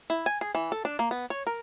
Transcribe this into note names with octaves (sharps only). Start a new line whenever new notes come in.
E4
G#5
G#4
E3
A4
D4
A#3
B3
C#5
A#4